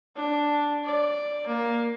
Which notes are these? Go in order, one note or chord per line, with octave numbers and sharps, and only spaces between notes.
D4
D5
A#3